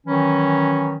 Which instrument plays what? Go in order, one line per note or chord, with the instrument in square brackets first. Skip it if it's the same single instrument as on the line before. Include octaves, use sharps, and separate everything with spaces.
[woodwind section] D#3 E3 F#3 C#4